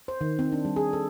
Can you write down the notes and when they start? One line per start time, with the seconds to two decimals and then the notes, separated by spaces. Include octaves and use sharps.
0.08 C5
0.21 D#3
0.39 C4
0.52 D4
0.65 G3
0.76 G#4
0.93 A4